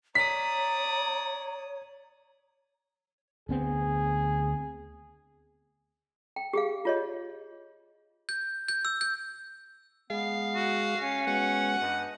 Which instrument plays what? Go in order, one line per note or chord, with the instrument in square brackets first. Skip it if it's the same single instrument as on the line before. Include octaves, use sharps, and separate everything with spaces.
[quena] C#5 [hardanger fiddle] D5 D#6 [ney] A#5 [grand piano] B6
[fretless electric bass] D2 B3 C4 [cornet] G#4
[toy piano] G5
G4 G#4 F5
F4 C#5 D#5
[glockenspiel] G6
G6
E6
G6
[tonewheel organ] G#3 G#4 [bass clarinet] B3 [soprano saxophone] F5
[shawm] F#4
[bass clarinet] C#4
[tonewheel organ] G#3 B3 [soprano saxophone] F#4 [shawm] F#5
[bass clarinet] G2 [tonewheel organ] D#5 G#5